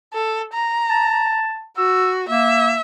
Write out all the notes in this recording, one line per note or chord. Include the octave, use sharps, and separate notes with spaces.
A4
A#5
A5
F#4 E6
A#3 E5